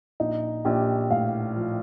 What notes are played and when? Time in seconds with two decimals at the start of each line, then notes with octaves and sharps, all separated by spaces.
0.20 A#1 D#4
0.65 A#1 G4
1.10 A2 F5
1.56 F3